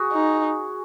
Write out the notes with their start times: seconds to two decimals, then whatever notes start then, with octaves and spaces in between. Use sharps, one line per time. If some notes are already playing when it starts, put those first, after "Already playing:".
Already playing: F#4 G#4
0.13 D#4